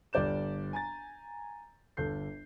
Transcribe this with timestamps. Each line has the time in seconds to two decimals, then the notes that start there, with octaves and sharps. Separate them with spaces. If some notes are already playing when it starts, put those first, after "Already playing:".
0.13 G1 G3 D5 G6 E7
0.73 G#5 A#5 A6
1.97 G1 A4 G6 C7